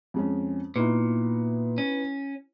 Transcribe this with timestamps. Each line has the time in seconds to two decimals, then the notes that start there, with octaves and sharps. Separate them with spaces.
0.14 F2 G#3 C#4
0.76 A#2 B3 D#4 E4
1.78 C#4